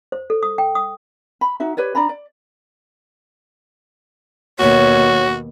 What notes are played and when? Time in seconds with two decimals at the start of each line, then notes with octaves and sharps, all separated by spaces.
0.12 C5
0.30 A4
0.43 D#6
0.58 G5
0.75 D#6
1.41 B5
1.60 D#4 F#4 E5
1.77 G4 B4 C#5 D5
1.95 D4 D5 A#5 B5
2.09 D5
4.59 D#2 B2 F#4 C#5